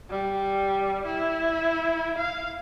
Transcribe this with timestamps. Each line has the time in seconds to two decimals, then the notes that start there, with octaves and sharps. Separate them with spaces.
0.10 G3
1.06 E4
2.18 F5